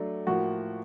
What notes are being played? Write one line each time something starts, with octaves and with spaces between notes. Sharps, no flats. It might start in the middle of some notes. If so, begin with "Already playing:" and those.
Already playing: F#3 A3 D4
A2 F3 A#3 F#4